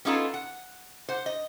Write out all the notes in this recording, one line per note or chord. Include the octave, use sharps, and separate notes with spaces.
B3 C#4 D#4 F4 G#4 A4
F#5
C5 F#5
D#5